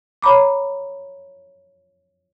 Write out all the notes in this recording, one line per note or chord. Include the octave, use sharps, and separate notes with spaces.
C#5 A#5 B5 D6